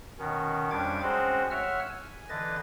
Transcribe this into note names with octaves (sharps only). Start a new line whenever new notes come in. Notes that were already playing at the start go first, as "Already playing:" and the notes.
B2 D#3 C#4
F2 G3 C#4 D4 D6 G#6
G#3 C4 C#4 F#4 G#4 C5
C#5 E5 F#5 E6 F6
G#5
D3 E3 B4 D#5 A6